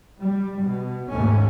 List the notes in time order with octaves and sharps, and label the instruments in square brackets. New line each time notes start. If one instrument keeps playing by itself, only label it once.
[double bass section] G3
B2
D#2 G#2 A3 A#3 C#4